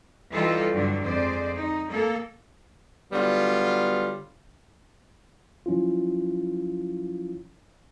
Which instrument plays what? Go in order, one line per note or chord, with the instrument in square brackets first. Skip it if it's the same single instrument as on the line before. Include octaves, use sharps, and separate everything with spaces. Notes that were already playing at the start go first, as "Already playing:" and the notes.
[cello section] E3 G3 D#4 F4 G4 A4
G2 D3 F#3 D4
F2 G#3 C5 D5
D#4
A#3 A4
[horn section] D3 F#3 G3 B3 F4
[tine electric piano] F3 F#3 C#4 E4 F4